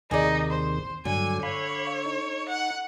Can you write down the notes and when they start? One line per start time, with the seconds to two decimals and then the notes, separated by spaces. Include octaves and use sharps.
0.11 D#2 C3 D#3 D#4 G#4 D5
0.51 C5
1.05 G2 D3 F#3 G#5
1.43 C#5 F5 B5
2.06 D#4
2.49 F#5